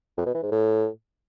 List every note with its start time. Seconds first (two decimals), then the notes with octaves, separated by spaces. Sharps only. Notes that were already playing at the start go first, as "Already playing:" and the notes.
0.18 F2
0.26 B2
0.35 E3
0.43 G#2
0.52 A2